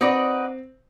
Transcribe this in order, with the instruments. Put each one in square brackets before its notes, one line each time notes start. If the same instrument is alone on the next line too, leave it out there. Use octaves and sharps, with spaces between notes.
[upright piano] C4 [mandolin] D#4 F#4 B4 D5